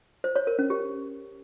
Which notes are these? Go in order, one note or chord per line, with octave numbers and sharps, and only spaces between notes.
C5
C#5
A#4
C#4
G4